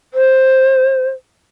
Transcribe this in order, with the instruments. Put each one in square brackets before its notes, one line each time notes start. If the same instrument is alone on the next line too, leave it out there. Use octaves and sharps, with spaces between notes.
[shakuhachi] C5